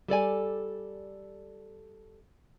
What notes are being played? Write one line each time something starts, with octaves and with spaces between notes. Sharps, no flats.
G3 A4 D5 G#5